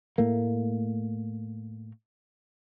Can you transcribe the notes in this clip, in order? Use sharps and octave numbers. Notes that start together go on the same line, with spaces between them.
A2 A3 A#3